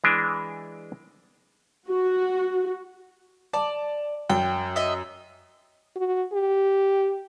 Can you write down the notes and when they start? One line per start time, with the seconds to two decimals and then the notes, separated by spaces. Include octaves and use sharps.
0.04 E3 G#3 D4
1.88 F#4
3.53 D5 A5
4.30 F#2 G5
4.76 D#5 E5
5.96 F#4
6.33 G4